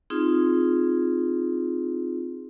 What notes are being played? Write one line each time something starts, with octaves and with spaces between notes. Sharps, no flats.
C4 D#4 F4 G#4